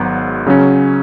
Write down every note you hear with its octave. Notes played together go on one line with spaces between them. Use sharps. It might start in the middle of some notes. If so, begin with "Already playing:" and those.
Already playing: G#1 G#2 F#3 B3
C#3 F#3 C#4